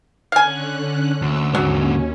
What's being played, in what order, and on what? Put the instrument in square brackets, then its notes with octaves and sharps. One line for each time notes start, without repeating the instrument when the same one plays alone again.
[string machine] D3 C#4 F#6 [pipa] F5 G#5
[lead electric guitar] D2 [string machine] E6
[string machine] D#2 C#4 [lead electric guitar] G#2 D3 [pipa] F#3